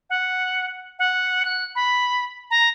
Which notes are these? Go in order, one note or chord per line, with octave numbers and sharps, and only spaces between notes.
F#5
F#5
F#6
B5
A#5